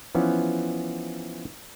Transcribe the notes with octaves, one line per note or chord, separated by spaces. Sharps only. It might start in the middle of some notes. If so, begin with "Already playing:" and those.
E3 F3 B3 C#4